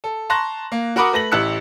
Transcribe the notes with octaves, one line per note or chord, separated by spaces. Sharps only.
A4
A5 A#5 C6 C#6 F#6 A#6
A#3
F#4 A#4 F#5 B5 D6 D#6
A3 B4 A#6 F#7
A1 E4 G4 E6 F#6 C#7